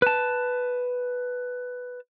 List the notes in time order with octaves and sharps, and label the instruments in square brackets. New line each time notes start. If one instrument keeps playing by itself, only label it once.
[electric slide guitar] B4 A5